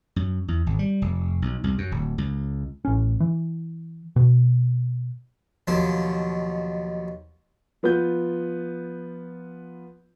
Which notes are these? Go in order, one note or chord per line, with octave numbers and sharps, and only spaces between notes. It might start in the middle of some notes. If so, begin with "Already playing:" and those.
F#2
E2
G#1
G3
F1
B1
C2
F#2
D1
C#2
A1 C#4
E3
B2
D#2 B2 F3 F#3 C6
F3 B3 F4 G6